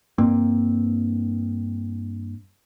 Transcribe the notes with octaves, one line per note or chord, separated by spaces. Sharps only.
G2 A#3 C4